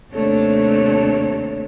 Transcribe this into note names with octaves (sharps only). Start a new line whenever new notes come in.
D#2 C3 A3 D4 C#5